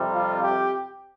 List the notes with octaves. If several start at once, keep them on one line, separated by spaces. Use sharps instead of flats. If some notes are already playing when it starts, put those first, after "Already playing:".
Already playing: F2 C3 G3
F4
G4